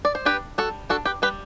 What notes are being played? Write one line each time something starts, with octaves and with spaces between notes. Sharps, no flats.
D5
C5
D4 G4 B4
G3 F#4 A4
D4 F#4 A4
G4 B4
G3 G4 B4